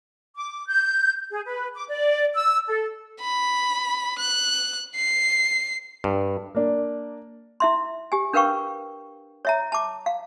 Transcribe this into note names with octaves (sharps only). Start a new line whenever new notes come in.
D6
G6
G#4
B4
D6
D5
E6
A4
B5
F#6
C7
G2
A#3 D4
E4 E5 C6
G4 G#5
D4 A#4 B4 F5 G5 C#6
C#5 E5 A#5
A5 D6
F5